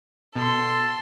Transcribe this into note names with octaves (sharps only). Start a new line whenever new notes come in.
B2 A4 C6